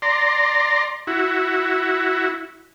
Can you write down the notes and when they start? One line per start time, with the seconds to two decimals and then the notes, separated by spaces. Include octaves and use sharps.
0.02 D5 A#5 C6
1.07 E4 F#4